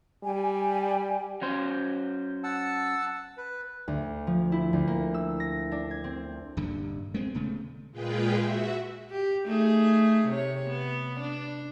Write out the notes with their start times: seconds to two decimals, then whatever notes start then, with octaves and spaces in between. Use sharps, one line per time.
0.23 G3 G5 G#5
1.42 F#3 C#4 C5
2.44 F#5 A5 E6
3.37 B4
3.88 D2
4.27 F3
4.52 E4
4.73 D2
4.87 A#3
5.14 E6
5.40 A#6
5.72 D4
5.91 G#6
6.04 C4
6.57 D#1 G2 D3
7.14 G#3 B3 C4
7.35 D#1 C#3 A3
7.91 A#2 G#3 F4 G#4 B4 G5
8.36 F#4 E5
9.11 G4
9.46 A3 D#4 G#4
10.27 C3 C#5
10.68 B3
11.20 D4